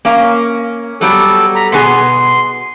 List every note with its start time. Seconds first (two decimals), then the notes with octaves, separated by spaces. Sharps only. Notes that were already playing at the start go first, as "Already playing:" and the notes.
0.05 A#3 C#4 F5
1.01 F#3 G3 B3 A4
1.56 A#5 B5
1.72 B2 B3 G#4 C6